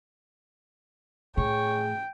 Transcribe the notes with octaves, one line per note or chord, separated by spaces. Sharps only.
A2 G#4 C#5 G5